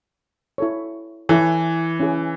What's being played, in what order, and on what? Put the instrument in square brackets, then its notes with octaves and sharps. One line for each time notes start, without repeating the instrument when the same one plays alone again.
[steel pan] E4 A4 C#5
[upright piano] E3 [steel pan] E4 A4 C#5
[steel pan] C#4 E4 G#4